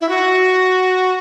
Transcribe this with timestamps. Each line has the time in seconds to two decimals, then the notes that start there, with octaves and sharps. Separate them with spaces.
0.01 E4
0.09 F#4